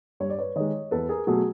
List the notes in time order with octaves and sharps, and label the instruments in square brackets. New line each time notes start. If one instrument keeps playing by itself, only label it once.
[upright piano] G2 C#5
D5
B4 C#5
D#3 G#3 C#5 D#5
E2 A4 B4
G#4 A#4
B2 F#3 A3 F#4 G#4